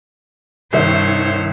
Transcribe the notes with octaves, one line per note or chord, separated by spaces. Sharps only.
C2 G2 D#3 C5 C#5 E5